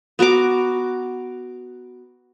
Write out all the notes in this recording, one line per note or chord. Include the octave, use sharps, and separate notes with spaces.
B3 F#4 A#5 D6